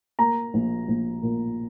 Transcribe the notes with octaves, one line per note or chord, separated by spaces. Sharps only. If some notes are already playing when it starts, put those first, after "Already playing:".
A#3 A#5
A#1
A#1
A#2